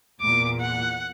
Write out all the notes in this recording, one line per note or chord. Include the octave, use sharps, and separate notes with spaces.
E2 A#2 D6
F#5